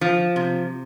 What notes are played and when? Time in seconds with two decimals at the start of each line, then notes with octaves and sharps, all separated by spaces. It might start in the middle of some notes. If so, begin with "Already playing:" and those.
0.01 F3
0.36 C3